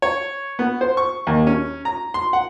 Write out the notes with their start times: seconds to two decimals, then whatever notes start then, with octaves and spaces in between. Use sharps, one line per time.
0.02 C#5
0.59 B3
0.81 C5
0.97 C#6
1.27 D#2
1.47 C#4
1.85 A#5
2.14 C6
2.33 F#5